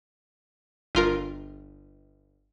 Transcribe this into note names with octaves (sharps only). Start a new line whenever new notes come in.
G1 F4 A#4